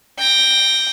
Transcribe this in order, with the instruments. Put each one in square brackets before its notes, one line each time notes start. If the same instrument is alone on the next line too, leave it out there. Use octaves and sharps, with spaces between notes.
[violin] G5 A#6